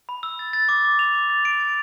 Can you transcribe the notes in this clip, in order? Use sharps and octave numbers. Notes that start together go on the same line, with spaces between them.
B5
E6
A6
A6
D6
D6
F7
D6
A6
D7
A6